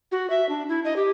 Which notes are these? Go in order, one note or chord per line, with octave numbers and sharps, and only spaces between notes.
F#4
E5
D4
E4
D#5
G4